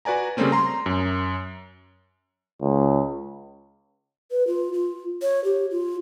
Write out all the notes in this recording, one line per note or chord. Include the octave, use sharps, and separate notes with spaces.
F#4 B4 D5 G#5 A#5
C#3 G3 A3 A#3 C4 C#4
A#5 C6
F#2
C#2
B4
F4
F4
C#5
G4
F4